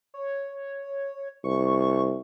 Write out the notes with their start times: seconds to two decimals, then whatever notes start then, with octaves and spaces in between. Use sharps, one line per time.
0.14 C#5
1.44 C2 C#6